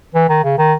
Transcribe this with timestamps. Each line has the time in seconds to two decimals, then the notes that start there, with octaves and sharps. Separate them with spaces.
0.15 E3
0.29 D#3
0.44 C#3
0.58 D#3